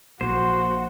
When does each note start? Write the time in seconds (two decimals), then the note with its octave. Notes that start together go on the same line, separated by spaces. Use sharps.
0.21 A#1 A#3 F#4 C5